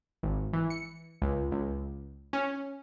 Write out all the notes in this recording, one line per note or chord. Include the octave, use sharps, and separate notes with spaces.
G#1
E3
C#7
C#2
C#2
C#4